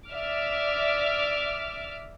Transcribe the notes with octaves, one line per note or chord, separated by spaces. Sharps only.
D5 E5 D6 F6